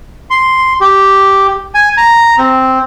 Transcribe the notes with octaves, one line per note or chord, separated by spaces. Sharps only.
C6
G4
G#5
A#5
C4